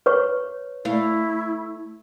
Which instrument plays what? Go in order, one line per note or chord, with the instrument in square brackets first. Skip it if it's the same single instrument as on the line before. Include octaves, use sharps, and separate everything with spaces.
[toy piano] B4 C#5 C#6
[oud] A3 F5 [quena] E4